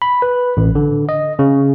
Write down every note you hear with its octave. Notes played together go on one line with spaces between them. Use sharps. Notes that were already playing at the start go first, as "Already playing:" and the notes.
B5
B4
A1
D3
D#5
C#3